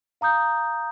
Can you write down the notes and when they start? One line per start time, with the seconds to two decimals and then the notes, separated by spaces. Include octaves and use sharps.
0.21 F5 A#5 D#6 G6